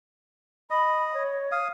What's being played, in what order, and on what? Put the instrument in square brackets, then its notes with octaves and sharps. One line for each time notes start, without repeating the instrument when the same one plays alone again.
[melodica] D#5 [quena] B5
[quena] C#5
[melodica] F5 D#6